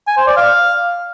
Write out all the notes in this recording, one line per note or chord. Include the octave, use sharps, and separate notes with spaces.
G#5
C5
D5
F5